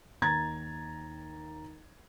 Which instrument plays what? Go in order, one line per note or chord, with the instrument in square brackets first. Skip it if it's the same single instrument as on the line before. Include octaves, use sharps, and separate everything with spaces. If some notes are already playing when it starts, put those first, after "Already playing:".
[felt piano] D#2 D#3 A#5 G#6 A6